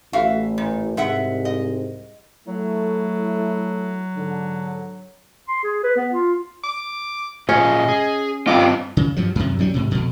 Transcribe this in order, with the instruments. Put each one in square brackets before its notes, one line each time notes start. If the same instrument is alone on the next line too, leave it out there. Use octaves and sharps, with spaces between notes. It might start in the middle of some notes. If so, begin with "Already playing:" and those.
[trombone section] A1 [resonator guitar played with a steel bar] F#4 E5 F5
[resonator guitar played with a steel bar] A#2
[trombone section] C2 G#2 [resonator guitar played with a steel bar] G#3 E5 F#5
[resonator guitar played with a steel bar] D#5
[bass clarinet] F#3 [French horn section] A3 E4
[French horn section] G#2 D3
[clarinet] C6
G#4
B4
B3
F4
[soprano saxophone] D6
[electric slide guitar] A#2 G#3 F4 [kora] C#4 [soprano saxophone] D#5
[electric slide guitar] G#4
[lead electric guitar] G2 F4 [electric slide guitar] C4 D#5 [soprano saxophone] D6
[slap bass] C#3
G2 F3 F#3
F#2 C3
F#3 G3 C#4 D4
G#2 C3
F2 B2